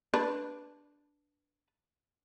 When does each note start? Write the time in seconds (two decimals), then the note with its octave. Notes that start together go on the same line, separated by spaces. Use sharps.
0.14 D4 B4